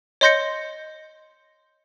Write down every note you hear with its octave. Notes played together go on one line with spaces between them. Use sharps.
C#5 D#5 C6 G6 A#6 C#7